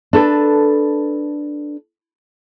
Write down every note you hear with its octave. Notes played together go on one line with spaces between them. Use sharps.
D4 A4 B4